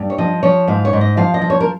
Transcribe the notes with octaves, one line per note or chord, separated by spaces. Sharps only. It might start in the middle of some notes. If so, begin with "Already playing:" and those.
Already playing: G2
C#5
F3 D#5
F3 C#5
G#2 F5
C#5
G#2
D#5
F3 F5
D#5
F3
C#5
A#4